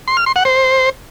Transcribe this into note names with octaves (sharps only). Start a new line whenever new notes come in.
C6
F6
C6
F#5
C5